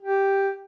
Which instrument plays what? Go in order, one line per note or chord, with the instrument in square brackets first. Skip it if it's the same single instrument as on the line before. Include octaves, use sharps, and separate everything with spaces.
[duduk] G4